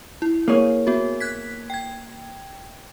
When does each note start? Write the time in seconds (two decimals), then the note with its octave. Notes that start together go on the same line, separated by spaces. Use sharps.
0.22 E4
0.48 A#3 G#4 C#5
0.87 B3 F#4
1.20 F#6 G#6 B6
1.70 G5 G#6